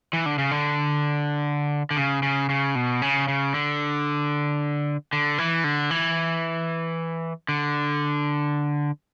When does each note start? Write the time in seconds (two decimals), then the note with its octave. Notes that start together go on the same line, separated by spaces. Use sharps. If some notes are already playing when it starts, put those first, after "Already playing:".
0.13 E3
0.26 D3
0.38 C#3
0.51 D3
1.91 D3
1.97 C#3
2.23 C#3
2.49 C#3
2.75 B2
3.02 C#3
3.28 C#3
3.54 D3
5.13 D3
5.38 E3
5.64 D3
5.90 E3
7.49 D3